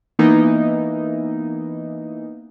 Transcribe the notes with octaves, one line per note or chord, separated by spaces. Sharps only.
E3 A#3 B3 D#4 E4